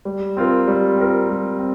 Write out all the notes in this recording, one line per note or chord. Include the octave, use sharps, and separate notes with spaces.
G3
C4 F4 A#4
G3
C4 F4 A#4
G3
C4